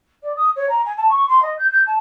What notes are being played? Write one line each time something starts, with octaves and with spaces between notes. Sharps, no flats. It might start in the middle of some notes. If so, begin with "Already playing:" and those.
D5
D#6
C#5
A#5
G#5
A5
C#6
C6
D#5
G6
G6
A5